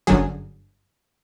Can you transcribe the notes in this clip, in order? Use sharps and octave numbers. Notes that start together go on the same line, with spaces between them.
G1 F#2 D3 F#3 G#4